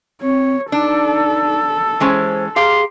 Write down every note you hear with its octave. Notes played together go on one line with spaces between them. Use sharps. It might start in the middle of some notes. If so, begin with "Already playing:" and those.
C4 C#5
D4 D#4 A4
E3 G#3 C#4 C5
G4 G#4 F5 A#5 C6